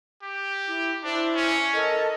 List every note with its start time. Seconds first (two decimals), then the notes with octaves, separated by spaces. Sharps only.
0.23 G4
0.67 E4 D6
1.04 D4 E4 C5
1.35 C#4
1.73 A4 A#4 D#5